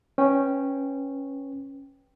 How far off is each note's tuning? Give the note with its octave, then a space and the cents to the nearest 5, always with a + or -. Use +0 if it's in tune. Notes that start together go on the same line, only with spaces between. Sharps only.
C#4 -10 B4 +0 G5 +0